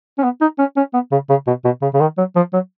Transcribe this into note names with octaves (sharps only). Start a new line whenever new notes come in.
C#4
B3
D#4
C#4
C#4
B3
C#3
C#3
B2
B2
C#3
C#3
D#3
F#3
F3
F#3